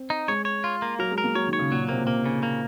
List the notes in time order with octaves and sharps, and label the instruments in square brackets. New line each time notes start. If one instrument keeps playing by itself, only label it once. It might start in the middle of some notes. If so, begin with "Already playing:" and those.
Already playing: [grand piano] C4
[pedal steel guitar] D#4
[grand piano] G#3 [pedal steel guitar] C#5
[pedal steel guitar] C#5
F4
A#3
[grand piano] F#3 [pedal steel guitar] A#4
[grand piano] G#3
[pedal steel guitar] A#4
[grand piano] A#3
[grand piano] F#3 [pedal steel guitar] C#5
[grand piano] D#3
[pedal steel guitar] C#5
[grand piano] C#3
[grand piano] A#2 [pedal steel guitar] F#3
[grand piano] C3 [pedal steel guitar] A#3
[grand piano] A#2
[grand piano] C3 [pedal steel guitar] A#3
[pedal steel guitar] C#3
A#3